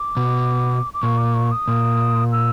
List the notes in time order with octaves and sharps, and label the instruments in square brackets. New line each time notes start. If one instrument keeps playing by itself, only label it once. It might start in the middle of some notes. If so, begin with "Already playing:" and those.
Already playing: [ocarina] D6
[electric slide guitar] B2
[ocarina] D6
[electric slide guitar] A#2 [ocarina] C#6
[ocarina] D6
C#6
D#6
[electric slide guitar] A#2
[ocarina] E6